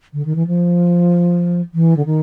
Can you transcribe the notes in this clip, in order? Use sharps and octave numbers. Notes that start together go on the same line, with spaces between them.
D3
D#3
E3
F3
E3
D3
D#3